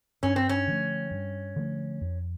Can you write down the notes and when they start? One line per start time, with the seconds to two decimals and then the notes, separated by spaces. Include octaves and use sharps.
0.23 G2 C#4
0.36 C4
0.49 C#4
0.68 D3 F3 A3
1.11 G2
1.56 D3 F3 A3
2.01 F2